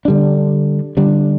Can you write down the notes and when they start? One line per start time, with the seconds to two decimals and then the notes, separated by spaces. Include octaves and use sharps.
0.05 D3 G3 D4
0.97 D3 G3 D4